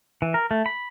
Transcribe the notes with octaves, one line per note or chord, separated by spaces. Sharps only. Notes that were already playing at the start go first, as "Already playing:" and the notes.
E3
A#4
A3
B5